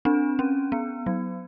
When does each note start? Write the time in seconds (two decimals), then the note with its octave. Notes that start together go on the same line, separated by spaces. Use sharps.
0.05 C4 D4
0.39 C#4
0.72 B3
1.06 F#3